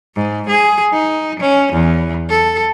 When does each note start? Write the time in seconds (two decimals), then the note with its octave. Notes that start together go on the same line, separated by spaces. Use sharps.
0.15 G#2
0.49 G#4
0.93 D#4
1.39 C#4
1.73 E2
2.29 A4